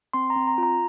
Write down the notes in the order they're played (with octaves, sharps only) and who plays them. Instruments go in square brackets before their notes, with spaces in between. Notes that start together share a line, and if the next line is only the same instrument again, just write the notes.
[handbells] C4 C6
A#5
C4
A#5
F4
A#5